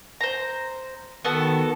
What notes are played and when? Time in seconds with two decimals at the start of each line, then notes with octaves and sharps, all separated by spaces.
0.21 C5 A#5
1.25 D#3 B3 F#4 A4